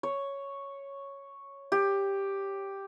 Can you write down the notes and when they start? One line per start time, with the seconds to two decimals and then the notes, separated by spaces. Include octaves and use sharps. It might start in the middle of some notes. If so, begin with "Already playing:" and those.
0.03 C#5
1.72 G4